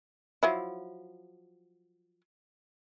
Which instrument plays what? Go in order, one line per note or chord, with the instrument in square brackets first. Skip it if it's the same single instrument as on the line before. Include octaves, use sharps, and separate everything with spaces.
[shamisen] F3 F#3 E4